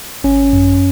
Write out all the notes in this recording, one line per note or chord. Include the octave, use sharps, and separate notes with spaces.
G#1 C#4
F#2